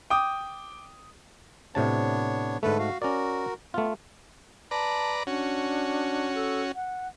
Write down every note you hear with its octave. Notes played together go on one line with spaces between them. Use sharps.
G5 D6 D#6
A2 C3 B3 D4 C#5 A5
G#2 D3 A3 A4 B4
F#4 F5
C#4 F#4 A#4 D5
A3 B3 F4
B4 D5 A5 A#5
C#4 D4 F#4
A4
F#5